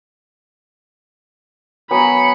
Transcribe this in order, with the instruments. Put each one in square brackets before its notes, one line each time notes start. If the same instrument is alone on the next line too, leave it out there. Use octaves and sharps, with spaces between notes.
[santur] F#3 B3 G#5 [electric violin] B5 C#7